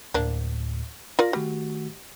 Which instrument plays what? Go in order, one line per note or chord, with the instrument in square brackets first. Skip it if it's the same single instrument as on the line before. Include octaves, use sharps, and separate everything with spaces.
[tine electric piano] D2 A2 [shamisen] A#3 D4
[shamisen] F4 A#4 D5 [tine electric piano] A#6
[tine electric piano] D#3 A3 F#4 [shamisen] G3